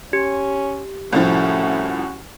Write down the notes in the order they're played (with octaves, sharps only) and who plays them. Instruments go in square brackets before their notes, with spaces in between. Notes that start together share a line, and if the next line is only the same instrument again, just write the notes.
[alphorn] C#4 [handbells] G4
[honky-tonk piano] C2 A2 F3 [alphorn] A3 [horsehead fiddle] C#4 F#4